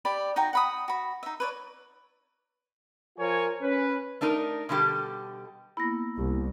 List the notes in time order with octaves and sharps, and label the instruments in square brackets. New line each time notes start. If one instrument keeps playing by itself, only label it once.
[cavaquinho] G4 D5 B5
D#4 F#4 G5 A#5
F#5 B5 D#6
F#4 B5
D#4 E5
B4 C#5 D5
[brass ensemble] F3 F4 A#4 C#5 G#5
C#4 B4
[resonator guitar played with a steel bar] A3 D4 D#4 A#4
B2 D3 G3 E4 G4 A4
[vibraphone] A#3 B3 E4 [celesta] B5 A#6
[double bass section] C2 [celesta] G4